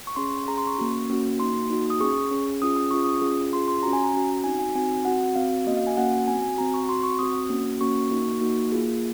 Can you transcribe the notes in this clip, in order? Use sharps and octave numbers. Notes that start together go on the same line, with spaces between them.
C#6
C#4 G#4 C6
C#4 G#4 A#5
C6
C#6
A#3 C#4 F#4
A#3 C#4 F#4
A#3 D#4 F#4 C6
A#3 D#4 F#4
D#6
C#4 G#4 C#6
C#4 G#4
C#4 F4 G#4 D#6
D#6
C#4 F4 G#4 C#6
D#6
C#4 F4 G#4
C#4 F4 G#4 C6
C6
C#4 F#4 A#5
G#5
A#5
C#4 F#4
C4 D#4 F#4 G#5
G#5
C4 D#4 F#4 G#5
C4 F#4 F#5
C4 F#4 F5
A#3 C#4 F#4 D#5
F5
G#5
A#3 C#4 F#4 F#5
C4 F#4 G#5
G#5
C4 F#4 A#5
C#6
C4 F#4 C6
C#6
C4 F#4 D#6
A#3 C#4 F#4
A#3 C#4 F#4 C#6
A#3 D#4 F#4
A#3 D#4 F#4
A#3 F4 G#4